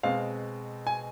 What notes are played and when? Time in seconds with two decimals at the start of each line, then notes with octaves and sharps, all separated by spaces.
0.03 B2 G#3 C4 F5
0.87 G#5